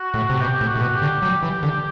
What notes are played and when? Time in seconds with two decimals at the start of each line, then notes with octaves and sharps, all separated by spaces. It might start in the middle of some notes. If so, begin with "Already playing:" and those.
Already playing: F#4
0.14 A2
0.30 C3
0.41 B2 G4
0.61 A2
0.67 F#4
0.76 A2
0.81 B2
0.95 G4
1.02 D3
1.22 F#3 G4
1.43 E3
1.63 D3